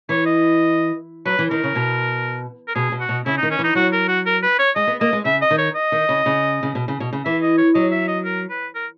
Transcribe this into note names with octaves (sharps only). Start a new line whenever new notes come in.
E3 C#5
D#5
F#3 B4
E3
D#3 A#4
C#3
B2
A#4
B2 G#4
B2
F#4
B2
C#3 E4
D#4
D#3
C#4
E3
D#4
F#3 F#4
A#4
F#4
A#4
B4
C#5
G#3 D#5
B3
A#3 D#5
G#3
C#3 E5
D#5
D#3
C#5
D#5
D#3
C#3
C#3
C#3
B2
C#3
B2
C#3
E3 E5
D#5
C#5
F#3 D#5
E5
D#5
A#4
B4
A#4